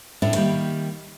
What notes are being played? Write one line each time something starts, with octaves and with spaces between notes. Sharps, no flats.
A2 C#4 D4 E4
D#3 G3 A#3